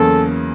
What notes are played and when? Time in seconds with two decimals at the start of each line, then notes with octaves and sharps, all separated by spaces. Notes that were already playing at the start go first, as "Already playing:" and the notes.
Already playing: E2 C#3 F#3 A#3 C#4 A4